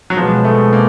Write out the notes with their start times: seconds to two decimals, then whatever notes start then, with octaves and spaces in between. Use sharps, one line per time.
0.10 F#3
0.17 B2 F3 G#3 B3
0.45 A3
0.73 A#3